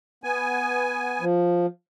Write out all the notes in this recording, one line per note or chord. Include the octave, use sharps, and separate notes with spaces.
B3 G#5
F3